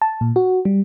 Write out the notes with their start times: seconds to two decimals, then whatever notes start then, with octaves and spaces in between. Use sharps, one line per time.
0.02 A5
0.21 A#2
0.36 F#4
0.65 G3